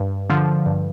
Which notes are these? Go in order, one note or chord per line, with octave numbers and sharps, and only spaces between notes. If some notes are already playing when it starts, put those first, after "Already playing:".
Already playing: G2
D3 F3
G2